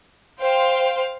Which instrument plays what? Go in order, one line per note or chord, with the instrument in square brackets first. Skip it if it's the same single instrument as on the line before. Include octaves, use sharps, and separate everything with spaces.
[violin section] C5 F5 G5